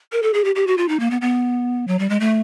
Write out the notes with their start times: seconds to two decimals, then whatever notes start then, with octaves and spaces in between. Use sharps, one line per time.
0.12 A#4
0.23 A4
0.34 G#4
0.44 G4
0.55 G4
0.67 F#4
0.78 F4
0.89 D#4
1.00 A#3
1.11 B3
1.21 B3
1.88 F#3
1.99 G3
2.10 G#3
2.20 A3